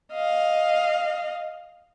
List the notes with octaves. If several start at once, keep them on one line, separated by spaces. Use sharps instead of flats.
D#5 F5